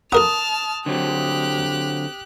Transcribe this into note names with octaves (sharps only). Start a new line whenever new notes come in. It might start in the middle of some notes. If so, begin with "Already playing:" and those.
A4 A#4 F#5 A5 D#6 F6
D3 F#3 C4 G4 F#6